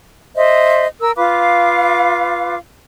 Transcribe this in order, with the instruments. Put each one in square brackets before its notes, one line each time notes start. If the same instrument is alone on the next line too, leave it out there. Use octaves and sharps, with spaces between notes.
[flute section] C5 D#5 E5
A#4 E6
F4 B4 F5 D6